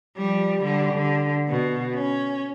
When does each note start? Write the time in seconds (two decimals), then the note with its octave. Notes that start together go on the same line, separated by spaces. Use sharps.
0.17 F3 G3
0.62 D3 G3
0.94 D3
1.49 B2
1.94 C#4